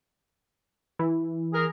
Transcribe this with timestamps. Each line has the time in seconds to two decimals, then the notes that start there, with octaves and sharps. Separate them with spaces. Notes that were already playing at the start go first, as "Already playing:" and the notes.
0.99 E3
1.54 G#4 A#4